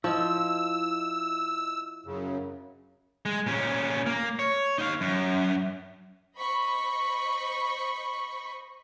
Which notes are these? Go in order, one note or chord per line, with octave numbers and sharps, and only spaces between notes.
F3 E4 D#5 E6
F#2 C#3
G#3
A#2 C#4
A#3
C#5
D#4 F5
F#2
C5 D#5 B5 C#6